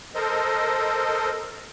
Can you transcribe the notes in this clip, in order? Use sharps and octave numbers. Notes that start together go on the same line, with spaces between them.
A4 A#4 C5 D#5